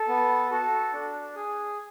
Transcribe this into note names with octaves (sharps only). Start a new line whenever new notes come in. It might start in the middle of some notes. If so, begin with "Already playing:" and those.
Already playing: A4
B3
F#4 A4
D4
G#4